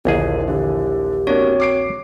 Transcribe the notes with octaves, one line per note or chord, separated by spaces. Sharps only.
A#1 D#2 A#2 D3 E4 G#4
D3 E3 G4
A#3 C4 D4 F#4 C#5
D6 C7 D7